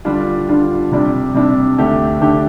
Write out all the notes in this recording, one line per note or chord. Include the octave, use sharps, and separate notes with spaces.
D3 G3 D4 F4
D3 G3 D4 F4
C3 G3 D4
C3 G3 D4
D2 D3 A3 D4 G4
D2 D3 A3 D4 G4